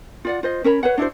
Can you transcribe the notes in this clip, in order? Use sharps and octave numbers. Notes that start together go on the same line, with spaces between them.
F4 D5 F#5
F4 C5 D#5
C#4 A#4 C#5 B5
B4 C#5 F#5
D4 E4 F#4 C5